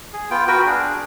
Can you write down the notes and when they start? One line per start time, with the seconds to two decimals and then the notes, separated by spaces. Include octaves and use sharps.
0.13 G#4
0.31 B3 F4 G5
0.48 F#4 A#4 B4 G5
0.66 D4 G#4